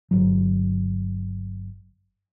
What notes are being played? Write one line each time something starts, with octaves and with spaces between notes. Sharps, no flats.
G1 F#3